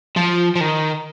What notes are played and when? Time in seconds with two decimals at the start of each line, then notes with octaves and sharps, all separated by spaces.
0.16 F3
0.55 F3
0.60 D#3